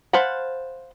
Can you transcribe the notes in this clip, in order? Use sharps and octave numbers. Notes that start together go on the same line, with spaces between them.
C5 F5 F#5 A5 B5